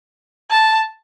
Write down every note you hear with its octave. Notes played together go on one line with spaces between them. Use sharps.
A5